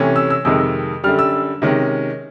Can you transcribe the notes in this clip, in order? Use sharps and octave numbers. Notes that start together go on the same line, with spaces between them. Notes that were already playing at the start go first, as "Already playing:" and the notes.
Already playing: C3 E3 A3 C#4
E6
E6
F2 C3 D#3 G#3 E6
F#2 D3 G3 F6
E6
C3 D#3 G#3 C#4